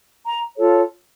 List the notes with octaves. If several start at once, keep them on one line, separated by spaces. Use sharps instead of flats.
A#5
F4 A4 C#5